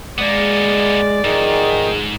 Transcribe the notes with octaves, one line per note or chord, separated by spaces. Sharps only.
G#3 A#3 B3 D5
D2 G#2 D#3 F3 G#4